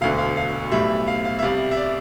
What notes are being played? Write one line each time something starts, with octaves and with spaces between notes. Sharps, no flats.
E1 D2 D3 F5
F5
F5
B1 A2 G3 E5
F5
F5
E5
C2 C3 G3 F5
E5
D5